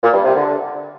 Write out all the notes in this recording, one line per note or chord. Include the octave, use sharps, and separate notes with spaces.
A#2
G2
C3
D3